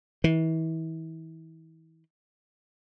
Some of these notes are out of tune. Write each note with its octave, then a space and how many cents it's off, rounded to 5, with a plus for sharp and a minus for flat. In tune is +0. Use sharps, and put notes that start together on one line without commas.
E3 -35